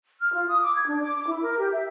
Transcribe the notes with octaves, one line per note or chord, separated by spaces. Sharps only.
F6
F4
D#6
D6
G#6
D4
D6
D6
E4
A#4
G4
E5